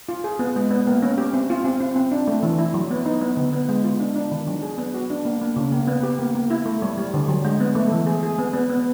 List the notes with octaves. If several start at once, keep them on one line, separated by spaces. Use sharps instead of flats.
F4
G#4
B3
G#3
B3
A#3
C#4
G4
C4
F4
C4
C4
C4
D4
A3
E3
E4
F#3
B3
D#4
B3
D3
B3
G#3
F4
D4
D4
D#3
F#3
G#4
B3
F#4
D4
A#3
A#3
C#3
A#3
B3
G4
A#3
A#3
E4
A3
G3
G3
D3
F#3
G#3
B3
A3
E3
G#4
G#4
B3
B3
B3